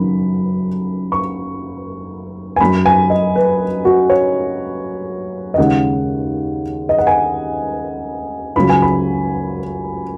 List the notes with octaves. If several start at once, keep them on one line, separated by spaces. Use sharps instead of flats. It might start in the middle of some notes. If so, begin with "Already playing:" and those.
Already playing: F#1 F#2 D#3 B5
C#6
G#5
F#2 F#3 B5
G#5
D#5
B4
F#4
C#5
D#5
D#2 C#3 G#3 F#5
D#5
F#5
G#5
C#2 C#3 F#3 B5
G#5
B5